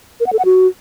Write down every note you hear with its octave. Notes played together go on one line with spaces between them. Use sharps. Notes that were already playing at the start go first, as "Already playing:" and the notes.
A#4
F#5
A4
F#5
F#4